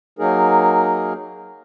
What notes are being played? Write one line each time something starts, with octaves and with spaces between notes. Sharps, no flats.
F#3 A#3 D#4 G#4 A#4